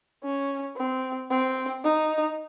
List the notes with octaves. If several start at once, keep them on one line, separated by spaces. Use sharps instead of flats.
C#4
C4
C4
D#4